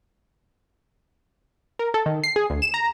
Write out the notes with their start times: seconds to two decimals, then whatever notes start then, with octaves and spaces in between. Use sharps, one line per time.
1.79 A#4
1.94 A4
2.06 D#3
2.24 C7
2.36 G#4
2.50 D2
2.62 E7
2.74 A#5